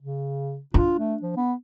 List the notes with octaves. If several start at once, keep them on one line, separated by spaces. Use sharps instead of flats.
C#3
D4 F4
A3
F3
B3